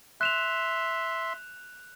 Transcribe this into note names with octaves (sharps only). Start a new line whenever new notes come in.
E5 C6 F#6 E7 F7